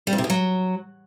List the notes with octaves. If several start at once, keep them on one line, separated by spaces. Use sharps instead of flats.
G3
F2
C3
B2
F#3